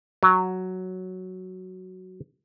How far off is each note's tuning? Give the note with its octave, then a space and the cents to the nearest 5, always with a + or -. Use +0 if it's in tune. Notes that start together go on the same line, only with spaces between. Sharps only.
F#3 +0